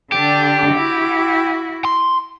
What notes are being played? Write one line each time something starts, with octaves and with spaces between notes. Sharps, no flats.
D3 D4 G4
E4 F#4
C6